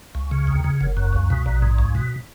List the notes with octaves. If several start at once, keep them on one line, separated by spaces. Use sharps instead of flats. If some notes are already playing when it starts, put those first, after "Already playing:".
C#2
C#3
D#2
C#3
F#1
F#2
C#2
B2
A#1
G#2
C#2
B2